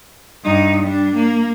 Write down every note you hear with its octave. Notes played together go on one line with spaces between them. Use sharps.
G2 D#4
G3 D4
A#3